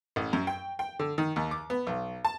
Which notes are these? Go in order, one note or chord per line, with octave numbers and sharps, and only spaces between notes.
A1
F#2
G5
G5
D3
D#3
D#2
D6
B3
B1
A5